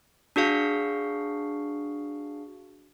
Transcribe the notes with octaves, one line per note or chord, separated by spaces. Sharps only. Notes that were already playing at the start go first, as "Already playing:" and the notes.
D4 F#4 G#4 F5